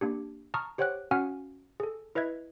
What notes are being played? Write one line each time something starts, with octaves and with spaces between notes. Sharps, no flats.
A#3 D4 G4
A5 A#5 C#6 D#6 F6
G4 C5 C#5 F#5 G5 F#6
C#4 F#4 F5 F#5 G#5 F6
G#4 A4
E4 B4 D#5 E5 G#6